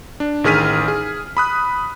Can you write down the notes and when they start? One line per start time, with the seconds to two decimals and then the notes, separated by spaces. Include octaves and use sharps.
0.20 D4
0.44 A1 D#3 G#4 F6 B6 D#7
0.88 G#4
1.37 B5 D#6 F#6